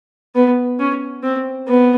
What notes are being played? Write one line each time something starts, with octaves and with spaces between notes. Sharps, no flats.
B3
C#4
C4
B3